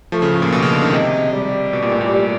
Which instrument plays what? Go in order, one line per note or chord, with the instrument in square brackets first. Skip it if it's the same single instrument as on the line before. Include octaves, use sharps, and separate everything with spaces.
[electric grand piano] F3 [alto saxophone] A3
[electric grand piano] C#3
A2
A#2
B2
C#3
D3
D#3
[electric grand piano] C3 [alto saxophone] G#3
[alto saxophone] G3
[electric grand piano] B2
A#2
A2
A#2
[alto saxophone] G3